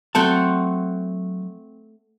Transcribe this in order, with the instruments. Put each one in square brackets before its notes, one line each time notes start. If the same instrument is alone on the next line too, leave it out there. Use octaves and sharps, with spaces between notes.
[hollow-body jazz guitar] F#3 A5 [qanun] A3 C4 F#5